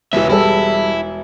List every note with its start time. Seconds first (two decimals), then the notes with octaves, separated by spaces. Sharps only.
0.13 E1 C#2 E3 E5
0.30 G3 E4 G#4 A4